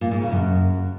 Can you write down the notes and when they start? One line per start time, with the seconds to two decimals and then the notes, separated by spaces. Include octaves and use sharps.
0.01 A#2
0.11 G#2
0.21 C#3
0.31 F#2